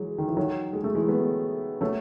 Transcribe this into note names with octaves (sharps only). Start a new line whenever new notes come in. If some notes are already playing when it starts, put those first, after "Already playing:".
Already playing: E3 F#3 G#3
D#3
E3
D#3 F#3
G#3
A3
E3 G#3
G#3 B3
F#3 A3